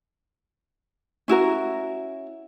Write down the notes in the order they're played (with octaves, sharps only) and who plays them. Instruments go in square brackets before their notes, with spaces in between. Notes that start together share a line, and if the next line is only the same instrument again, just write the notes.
[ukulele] C#4 E4 F#4 A#4